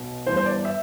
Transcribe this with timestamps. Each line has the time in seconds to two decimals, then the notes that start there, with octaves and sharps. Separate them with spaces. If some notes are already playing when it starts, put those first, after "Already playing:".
Already playing: B1 B2
0.26 G1 G2 E3 C5
0.37 C5
0.46 D5
0.65 E5